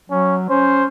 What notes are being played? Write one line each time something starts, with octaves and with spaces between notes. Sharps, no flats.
F#3 C#4
C#4 C5